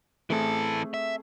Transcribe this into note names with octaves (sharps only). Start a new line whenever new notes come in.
E3 A3 C4 G#4 A4
E5